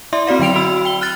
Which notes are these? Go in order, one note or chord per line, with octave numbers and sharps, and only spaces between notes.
E4 D5 E5 C6
C4 F#4 D5 F5
D3 F#3 G5 D7 F7
F#4 B5 E6
G5 G7
F6 F#6 A6